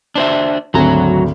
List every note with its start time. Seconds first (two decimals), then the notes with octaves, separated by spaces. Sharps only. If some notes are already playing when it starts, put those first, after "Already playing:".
0.15 D4 C5 E5
0.74 G#1 D2 F#3 A#5